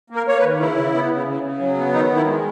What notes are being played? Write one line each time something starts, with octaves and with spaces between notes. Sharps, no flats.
A#3
A#4
A#3 C#5
B4
D#3
C#3 E4
C#3
B3
C#3
C#3
C#3
F#3
B3
D#3 D#4
D#3
E4
G#3